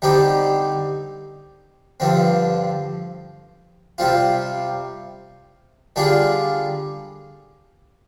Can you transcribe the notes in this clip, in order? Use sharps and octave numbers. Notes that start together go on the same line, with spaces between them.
D3 G3 C4 D#4 G4
G2 D3 F3 C4
C3 G3 C4 F4
D3 G3 D4 F4 G#4